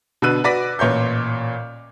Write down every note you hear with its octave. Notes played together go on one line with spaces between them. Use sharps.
B2 D3 B4 E6 F#6 D#7
F#4 B4 D5 D6 A#6 B6
A1 A#2 C#5 C6 G6